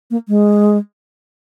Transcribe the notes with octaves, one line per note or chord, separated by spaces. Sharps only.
A#3
G#3